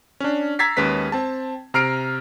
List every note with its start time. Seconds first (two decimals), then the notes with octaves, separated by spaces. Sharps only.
0.20 C#4 D4
0.59 A#5 E6 G#6 A6 B6 C7
0.77 D#2 G#3 C#4 B4 B6
1.12 C4 A5
1.74 C3 A#5 F6 C7 D7